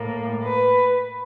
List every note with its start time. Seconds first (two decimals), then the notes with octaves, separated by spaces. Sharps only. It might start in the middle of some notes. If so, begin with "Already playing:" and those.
Already playing: A2 A#3
0.42 B4